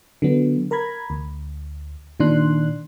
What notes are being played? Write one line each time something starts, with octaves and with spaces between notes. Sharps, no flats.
D3 F#3 B3
A#4 A#5 B5 G#6
D2
A#2 D#3 D4 C6 F#6